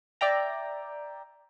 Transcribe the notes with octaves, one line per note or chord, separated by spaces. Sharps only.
D5 E5 G5 A#5